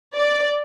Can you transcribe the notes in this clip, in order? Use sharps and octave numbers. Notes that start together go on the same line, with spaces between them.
D5